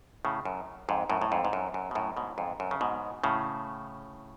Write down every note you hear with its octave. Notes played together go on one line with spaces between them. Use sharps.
A2 C#3
F#2
F2 G#2
F#2 A2
A2
F2 G#2
G#2
F#2
F#2
B2
F#2 A2
G#2 B2
F2 G#2
F#2
C#3
G#2 B2
A2 C#3